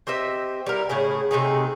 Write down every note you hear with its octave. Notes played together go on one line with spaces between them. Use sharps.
C4 G4 D#5 E5
G3 E4 A#4
A2 C#3 E4 G#4
C3 A3 D#4 G#4